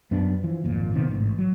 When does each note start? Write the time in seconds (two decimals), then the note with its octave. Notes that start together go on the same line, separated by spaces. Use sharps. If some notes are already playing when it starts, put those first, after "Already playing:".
0.11 F#2 B3 D4
0.43 E3 F3
0.64 G#1 F2 A#2
0.94 C3 D#3 A#3 B3
1.08 A1 G#2
1.38 F#3